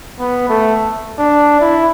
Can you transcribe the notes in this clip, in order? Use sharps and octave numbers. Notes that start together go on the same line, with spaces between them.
B3
A3
D4
E4